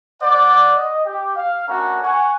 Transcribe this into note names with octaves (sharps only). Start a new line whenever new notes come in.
C5 D5 F#5
D#5
G4
F5
A3 C#4 D4 F#4 A#4 A#5
F#5 G#5 C#6